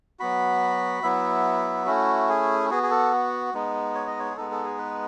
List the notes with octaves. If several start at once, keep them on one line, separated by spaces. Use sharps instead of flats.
F#3 B3 F#4 B5
F#3 B3 E4 E5
A3 C#4 E4 F#4
G#4
B3 F#4 G#4
G#4
A4
G#3 B3 D#4
C#5
D#5
C#5
G#4
G#3 B3 D#4 A4
A4
G#4
B4